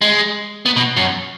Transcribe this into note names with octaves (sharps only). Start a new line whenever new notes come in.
G#3
B3
B2
F#2